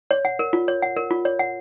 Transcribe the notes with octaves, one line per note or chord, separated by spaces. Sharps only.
C#5
F#5
A#4
F4
C#5
F#5
A#4
F4
C#5
F#5